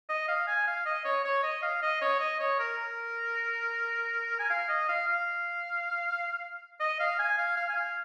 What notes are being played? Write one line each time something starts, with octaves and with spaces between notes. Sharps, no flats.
D#5
F5
G#5
F5
D#5
C#5
C#5
D#5
F5
D#5
C#5
D#5
C#5
A#4
A#4
G#5
F5
D#5
F5
F5
D#5
F5
G#5
F5
F5
G#5
F5